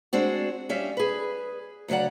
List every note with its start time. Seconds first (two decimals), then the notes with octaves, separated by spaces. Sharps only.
0.13 G#3 C4 D4 F#4
0.69 G3 C#4 E5 F5
0.97 G#4 B4
1.88 D2 C#3 F#3 D5 F#5